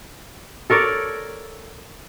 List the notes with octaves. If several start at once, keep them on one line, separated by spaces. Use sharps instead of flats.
A4 A#4 C#5 D5